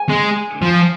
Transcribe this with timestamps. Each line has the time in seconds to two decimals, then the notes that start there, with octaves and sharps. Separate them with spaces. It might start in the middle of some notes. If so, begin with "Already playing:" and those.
Already playing: G#5
0.10 G#3
0.62 F3